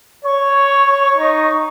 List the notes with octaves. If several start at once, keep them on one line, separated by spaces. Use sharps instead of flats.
C#5 C#6
D#4